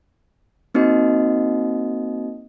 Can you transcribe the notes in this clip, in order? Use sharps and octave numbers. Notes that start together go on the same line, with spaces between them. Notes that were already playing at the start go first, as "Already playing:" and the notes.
A#3 C4 D#4 F#4 D#5